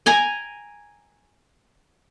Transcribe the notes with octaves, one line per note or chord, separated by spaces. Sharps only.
G5 G#5 A#5